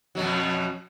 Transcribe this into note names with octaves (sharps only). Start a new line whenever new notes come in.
F2 B2 F#3